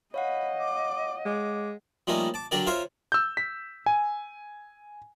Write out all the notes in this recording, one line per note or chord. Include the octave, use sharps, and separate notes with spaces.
C#5 D#5 F5 F#5 B5
D6
G#3 D6
F3 G3 A3 A#3 C#4 D#4
A5 D6
D3 F#3 D4 G4 A#4 D5
F4 A#4 C5 C#5 E5 F5
E6 G6
B6
G#5